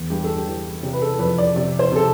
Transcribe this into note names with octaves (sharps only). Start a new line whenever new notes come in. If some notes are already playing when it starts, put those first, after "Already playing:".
Already playing: E2
G2 G4
A4
G4
E3
C3 G4
B4
A4
F2 B4
D5
C3 D5
C5
C3 A4